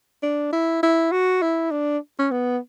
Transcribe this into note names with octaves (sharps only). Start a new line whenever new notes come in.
D4
E4
E4
F#4
E4
D4
C#4
B3